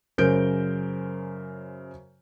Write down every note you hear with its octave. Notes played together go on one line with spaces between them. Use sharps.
F#2 C#3 A#4 C5 G6 D7